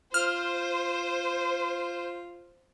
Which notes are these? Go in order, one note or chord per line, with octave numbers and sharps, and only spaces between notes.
F4 C5 F6